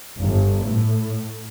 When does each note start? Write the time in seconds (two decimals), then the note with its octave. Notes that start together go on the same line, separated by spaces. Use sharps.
0.16 G1
0.61 A2